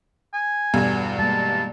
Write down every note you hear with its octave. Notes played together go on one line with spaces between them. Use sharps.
G#5
E2 G2 B2 B3 A4
G3 G#3 A#3 A5